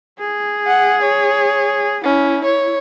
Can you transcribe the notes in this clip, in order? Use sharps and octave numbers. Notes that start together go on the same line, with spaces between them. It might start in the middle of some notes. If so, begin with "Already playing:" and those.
G#4
F#5
C#5
C#4 E4
C#5